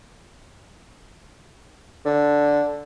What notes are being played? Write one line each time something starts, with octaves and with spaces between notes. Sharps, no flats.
D3